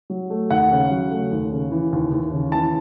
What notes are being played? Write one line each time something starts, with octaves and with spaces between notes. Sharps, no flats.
F#3
A3
D#2 F#5
C#3
F#3
A3
D#2
C#3
E3
D#2
D#2
C#3
E3 A5